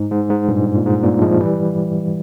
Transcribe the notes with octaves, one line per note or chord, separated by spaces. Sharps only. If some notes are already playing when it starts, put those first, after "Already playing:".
Already playing: G#2
G#2
G#2
G2 A#2
G#2
A#2
G#2
G2 A#2
F3 G#3
E3 G3